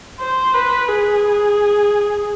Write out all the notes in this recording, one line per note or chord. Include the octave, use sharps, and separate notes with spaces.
C5
B4
G#4